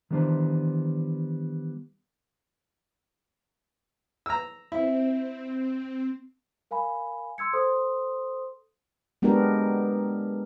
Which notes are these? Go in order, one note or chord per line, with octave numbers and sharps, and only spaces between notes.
D#3 E3 G3 B3 D4 C5
A#5 E6
C4 E4
A#4 F5 G#5 B5
C6 E6 G#6 C#7
A4 C5 C6 D#6
G#3 B3 D4 F#4 G4 A#4